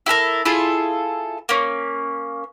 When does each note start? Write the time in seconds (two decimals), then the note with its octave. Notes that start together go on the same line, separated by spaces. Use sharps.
0.06 E4 G4 A4 A#4
0.45 E4 F4 G#4 A4
1.49 A#3 C#4